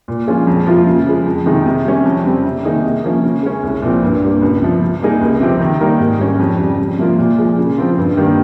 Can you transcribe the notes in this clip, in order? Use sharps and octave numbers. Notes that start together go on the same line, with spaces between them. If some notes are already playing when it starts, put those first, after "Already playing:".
A#2
F3 G#3 C#4 F4
F2
C3 F3 A#3 F4
C#3
F3 G#3
F2
C3 D#3 G#3 D#4
C3
G3 C#4
F2
C#3 G3 C4
C3
D#3 A#3 D#4 G#4
C3
F3 A#3 C#4
C#3
G#3 C#4
C2
A#2 F3 C4
G2
G3 A#3
C#2
C3 F3
C3
G3 A#3 D#4 G#4
C#2
C3 F3 C4 G4
D#3
G3 A#3 D#4 A#4
G#2
G3 C#4
F2
C#3 G3
F2
C3 F3 A#3 F4
A#2
F3 G#3
C#3
F3 C4 F4
G2
D#3 G3 A#3